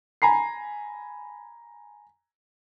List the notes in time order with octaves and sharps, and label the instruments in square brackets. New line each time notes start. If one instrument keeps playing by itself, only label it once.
[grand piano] G#5 A#5 B5 C7